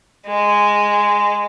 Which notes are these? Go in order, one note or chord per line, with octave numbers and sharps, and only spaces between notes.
G#3